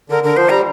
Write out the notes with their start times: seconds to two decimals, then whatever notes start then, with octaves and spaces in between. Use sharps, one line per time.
0.10 D3 A#4
0.24 D3 A#4
0.36 F3 C5
0.49 G3 A#5